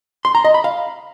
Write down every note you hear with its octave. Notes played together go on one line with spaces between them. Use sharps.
C6
A#5
D#5
B5
F5